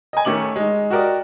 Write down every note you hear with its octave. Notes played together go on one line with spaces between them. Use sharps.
D#5 G#5
D#3 A3 C#4 D6 F#7
G#3 D#4
F#4 G4 A#4 D5 D#5